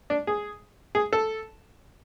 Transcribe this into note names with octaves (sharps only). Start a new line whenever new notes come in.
D4
G#4
G#4
A4